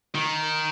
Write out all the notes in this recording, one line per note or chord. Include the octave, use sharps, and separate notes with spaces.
D#3